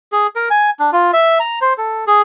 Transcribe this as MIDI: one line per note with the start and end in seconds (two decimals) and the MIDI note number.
0.12 0.27 68
0.36 0.49 70
0.50 0.70 80
0.80 0.90 62
0.92 1.11 65
1.13 1.39 76
1.40 1.59 82
1.61 1.73 72
1.78 2.05 69
2.07 2.22 68